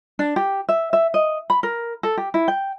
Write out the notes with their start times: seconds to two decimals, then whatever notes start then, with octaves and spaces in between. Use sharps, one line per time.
0.19 D4
0.36 G4
0.69 E5
0.93 E5
1.14 D#5
1.50 B5
1.63 A#4
2.03 A4
2.17 G4
2.34 E4
2.48 G5